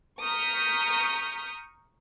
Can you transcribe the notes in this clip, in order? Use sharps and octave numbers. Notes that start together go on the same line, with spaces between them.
A#5 C#6 D#6 F6 G6 B6